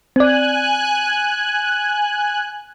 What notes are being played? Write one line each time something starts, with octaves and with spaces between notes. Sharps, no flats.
C4 D5 G#5 F#6